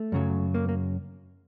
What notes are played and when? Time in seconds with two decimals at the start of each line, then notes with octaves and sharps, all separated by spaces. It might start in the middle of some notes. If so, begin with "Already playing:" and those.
Already playing: A3
0.12 F#2 C#3 F#3
0.54 A#3
0.69 A#3